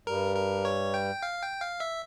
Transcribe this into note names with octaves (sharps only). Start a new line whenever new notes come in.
G2 G3 A#4
A#4
C#5
G5
F5
G5
F5
E5